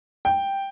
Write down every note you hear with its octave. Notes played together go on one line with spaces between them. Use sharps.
G5